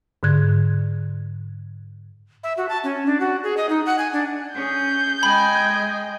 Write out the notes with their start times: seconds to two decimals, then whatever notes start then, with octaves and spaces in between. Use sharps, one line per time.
0.23 G#2 D3 F#6 G#6
2.43 E5
2.58 F#4
2.69 A5
2.84 C#4
3.06 D4
3.20 F#4
3.44 G#4
3.57 D#5
3.69 D#4
3.86 F#5
3.99 G#5
4.13 D4
4.55 C#4 G#4 G6
5.23 G#3 D#5 G5 G#5 B5